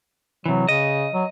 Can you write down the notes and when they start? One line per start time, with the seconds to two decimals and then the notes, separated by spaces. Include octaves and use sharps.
0.46 C3 E3 F#3
0.68 C#3 D#5
1.14 F#3